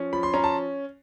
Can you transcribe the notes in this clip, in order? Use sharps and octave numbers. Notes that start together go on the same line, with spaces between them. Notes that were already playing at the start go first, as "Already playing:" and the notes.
Already playing: F3 C#4
F3 B5
C6
C#4 A#5
A5